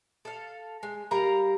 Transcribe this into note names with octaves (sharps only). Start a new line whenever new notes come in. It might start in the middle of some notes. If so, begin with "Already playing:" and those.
A4 F5
G#3
G3 A#4 F5 A#5